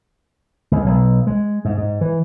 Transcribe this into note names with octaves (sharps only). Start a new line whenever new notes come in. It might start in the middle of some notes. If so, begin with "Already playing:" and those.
C#2
B1
G#3
G#2
G#2
E3